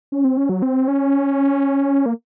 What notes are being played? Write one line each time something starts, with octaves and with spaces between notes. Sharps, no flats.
C#4
C4
C#4
F#3
C4
C#4
A#3